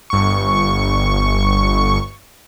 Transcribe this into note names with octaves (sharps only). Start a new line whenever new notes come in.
G1 C#6